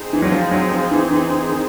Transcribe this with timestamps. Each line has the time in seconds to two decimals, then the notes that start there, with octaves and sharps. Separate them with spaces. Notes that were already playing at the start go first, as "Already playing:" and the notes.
Already playing: C4 D#4 G#4 C5
0.13 E3
0.22 F#3
0.32 F3
0.51 F#3
0.72 F3
0.91 E3
1.11 E3
1.30 E3
1.49 D#3